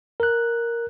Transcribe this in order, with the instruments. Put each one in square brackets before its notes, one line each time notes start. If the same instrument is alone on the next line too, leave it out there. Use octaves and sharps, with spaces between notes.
[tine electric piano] A#4 F#6